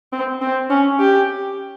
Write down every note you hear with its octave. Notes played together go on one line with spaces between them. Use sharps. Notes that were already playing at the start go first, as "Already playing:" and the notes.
C4
C4
C#4
G4